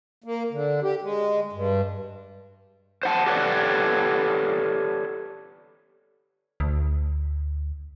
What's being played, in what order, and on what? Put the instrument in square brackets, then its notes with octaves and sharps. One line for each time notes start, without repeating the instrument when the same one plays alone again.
[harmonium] A#3
D3
G4
G#3
G2
[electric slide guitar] C5 F#5 A5
G4 A4 B4 C#5 D5 F#5
[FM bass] D2